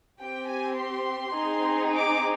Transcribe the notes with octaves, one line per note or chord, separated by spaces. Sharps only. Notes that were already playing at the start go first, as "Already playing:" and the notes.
C4 G4 G5
G#5
C6
C4 D#4 G#4
D6